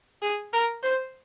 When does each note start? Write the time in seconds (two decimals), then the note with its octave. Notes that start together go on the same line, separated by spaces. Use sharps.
0.22 G#4
0.53 A#4
0.83 C5